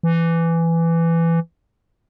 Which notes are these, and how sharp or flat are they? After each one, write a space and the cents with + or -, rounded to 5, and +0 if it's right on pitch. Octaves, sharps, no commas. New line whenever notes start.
E3 +15